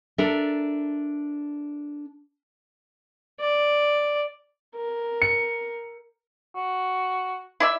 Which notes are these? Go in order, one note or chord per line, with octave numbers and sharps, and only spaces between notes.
D4 A4 A#4 E5
D5
A#4
C#7
F#4
E4 D5 E5